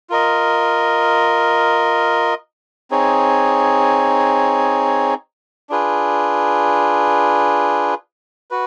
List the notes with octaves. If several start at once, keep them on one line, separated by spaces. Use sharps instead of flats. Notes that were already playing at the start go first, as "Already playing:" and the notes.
F4 A#4 D#5
C4 D#4 G#4 C#5
D4 F4 G#4 B4
F#4 B4